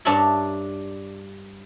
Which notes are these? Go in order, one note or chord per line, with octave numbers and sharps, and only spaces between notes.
G2 D4 A#4 C#5 E5 B5